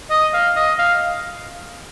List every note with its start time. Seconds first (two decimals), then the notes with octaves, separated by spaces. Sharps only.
0.10 D#5
0.34 F5
0.56 D#5
0.79 F5